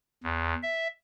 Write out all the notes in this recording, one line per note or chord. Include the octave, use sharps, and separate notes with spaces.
E2
E5